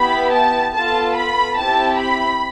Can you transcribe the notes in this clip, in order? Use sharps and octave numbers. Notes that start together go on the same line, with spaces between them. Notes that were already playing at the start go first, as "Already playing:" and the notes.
Already playing: B3 E4 G4 B5
A5
B3 F4 A4 A5
B5
C4 E4 G4 A5
B5